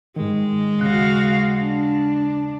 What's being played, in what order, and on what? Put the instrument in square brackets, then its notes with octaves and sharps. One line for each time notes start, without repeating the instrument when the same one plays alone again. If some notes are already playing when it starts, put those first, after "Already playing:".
[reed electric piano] G#2 D#3 [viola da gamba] G#3
[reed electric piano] D#2 C#3 F#6 [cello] F#4 F5
[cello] D4